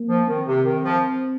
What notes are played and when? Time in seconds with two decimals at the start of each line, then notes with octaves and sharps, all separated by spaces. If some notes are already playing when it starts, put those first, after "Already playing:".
Already playing: A#3
0.08 F3
0.27 D#3 C4
0.46 C3
0.65 D#3
0.84 F3